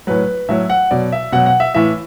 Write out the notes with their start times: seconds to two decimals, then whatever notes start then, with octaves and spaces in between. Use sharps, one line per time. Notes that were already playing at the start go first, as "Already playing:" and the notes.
0.07 A2 F#3 B4
0.49 A2 F#3 E5
0.70 F#5
0.91 B2 F#3 D5
1.12 E5
1.32 B2 F#3 F#5
1.46 F#5
1.60 E5
1.74 A2 E3 E5